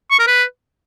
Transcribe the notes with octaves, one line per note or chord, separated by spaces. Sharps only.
C#6
A#4
B4